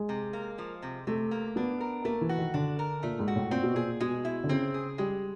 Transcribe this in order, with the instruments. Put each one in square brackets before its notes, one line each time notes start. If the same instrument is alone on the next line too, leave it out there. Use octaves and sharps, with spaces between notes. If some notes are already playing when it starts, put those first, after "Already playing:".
Already playing: [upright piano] G#3
[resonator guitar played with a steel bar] C3
A#3
F3
C3
[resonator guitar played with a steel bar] C3 [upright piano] A3
[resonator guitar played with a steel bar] A#3
[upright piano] B3 [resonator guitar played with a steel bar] D4
[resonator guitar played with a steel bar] A#4
[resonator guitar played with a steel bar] A3 [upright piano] A#3
[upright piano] E3
[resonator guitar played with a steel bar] F#4
[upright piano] D#3
[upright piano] D3 [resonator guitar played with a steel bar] D4
[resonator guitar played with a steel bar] A#4
[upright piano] A#2 [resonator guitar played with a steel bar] A3
[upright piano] G#2
[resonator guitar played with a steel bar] F#4
[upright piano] A2
[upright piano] A#2 [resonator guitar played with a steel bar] C4
[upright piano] B2
[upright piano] A#2 [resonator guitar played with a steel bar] G#4
[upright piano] B2 [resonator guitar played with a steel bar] G#3
[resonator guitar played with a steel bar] E4
[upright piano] D3
[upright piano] C#3 [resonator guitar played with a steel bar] C4
[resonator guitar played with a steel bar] G#4
[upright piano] G3 [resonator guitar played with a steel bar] G#3